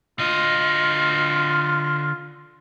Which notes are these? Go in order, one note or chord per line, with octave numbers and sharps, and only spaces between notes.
D3 F4 D#5